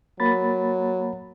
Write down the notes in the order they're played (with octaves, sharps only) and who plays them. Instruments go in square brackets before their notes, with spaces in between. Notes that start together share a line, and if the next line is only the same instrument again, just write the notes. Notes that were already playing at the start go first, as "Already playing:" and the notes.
[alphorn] F#3 [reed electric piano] A#3 B5 A6